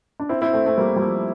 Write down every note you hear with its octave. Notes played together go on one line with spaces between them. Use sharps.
D4
C4 E4
C4 E4
A3 C4
A3 C4
G3 A#3
G3
F3 A3